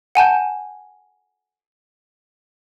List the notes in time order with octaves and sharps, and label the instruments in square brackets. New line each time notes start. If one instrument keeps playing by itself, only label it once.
[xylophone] F#5 G#5 A5 G6